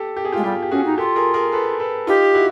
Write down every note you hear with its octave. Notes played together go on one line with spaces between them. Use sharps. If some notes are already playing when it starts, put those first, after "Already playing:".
Already playing: G4 A4
G4
G#4
F4 G4
G#3
G3 F4 G4
G4
C#4 F#4 G#4
D#4
F4 G4 A4
G#4 A#4
G#4 A#4
A4 B4
A4 B4
D#4 F4 G4
E4 F#4